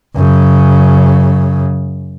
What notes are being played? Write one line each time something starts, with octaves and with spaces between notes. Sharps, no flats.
F#2 C#3